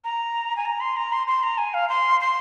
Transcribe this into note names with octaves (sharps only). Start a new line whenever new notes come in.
A#5
G#5
A#5
C6
A#5
C6
C6
A#5
G#5
F5
C6
C6